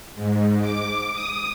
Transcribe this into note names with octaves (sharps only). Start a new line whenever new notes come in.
G#2
D6
D#6